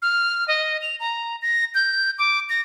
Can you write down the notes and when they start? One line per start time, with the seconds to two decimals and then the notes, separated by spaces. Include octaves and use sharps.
0.02 F6
0.48 D#5
0.82 F7
1.00 A#5
1.42 A#6
1.75 G6
2.18 D6
2.49 A#6